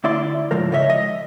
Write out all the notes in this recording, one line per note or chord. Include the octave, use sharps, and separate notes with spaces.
D2 E4 D5 C6
C#2 G#2 F3 A#4
C#3 C#5 D#5 E5
D#5